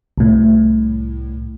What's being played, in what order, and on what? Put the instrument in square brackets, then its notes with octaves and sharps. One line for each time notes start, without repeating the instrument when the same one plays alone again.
[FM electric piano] C2 A2